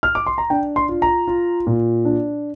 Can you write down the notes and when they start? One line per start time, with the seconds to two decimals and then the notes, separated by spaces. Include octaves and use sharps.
0.03 F6
0.15 D6
0.26 C6
0.38 A#5
0.50 D4 G5
0.76 C6
0.89 F4
1.02 A#5
1.28 F4
1.67 A#2
2.05 D4